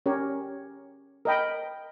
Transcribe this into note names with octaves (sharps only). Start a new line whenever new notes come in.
C#4 G4 A#4 C#5
A#4 D#5 G5 B5